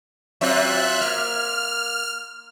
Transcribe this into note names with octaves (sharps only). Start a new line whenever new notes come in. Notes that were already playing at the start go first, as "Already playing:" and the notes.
F#3 C4 F4 E5 F#6
A#3 F6